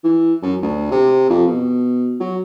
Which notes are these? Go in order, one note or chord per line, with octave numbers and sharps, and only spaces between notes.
E3
F#2
D2
C3
F2
B2
F#3